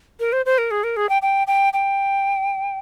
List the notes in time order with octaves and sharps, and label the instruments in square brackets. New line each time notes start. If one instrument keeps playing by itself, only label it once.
[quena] A#4
C5
C5
A#4
G#4
A#4
G#4
G5
G5
G5
G5